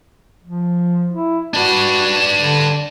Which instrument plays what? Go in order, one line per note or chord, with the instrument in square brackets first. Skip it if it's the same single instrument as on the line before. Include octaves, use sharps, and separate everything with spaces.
[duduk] F3
E4
[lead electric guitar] D4 B4 [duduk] F#4
[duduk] D3